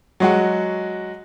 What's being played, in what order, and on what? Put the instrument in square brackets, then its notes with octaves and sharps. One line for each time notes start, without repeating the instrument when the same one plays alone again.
[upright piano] F#3 G#3 F#4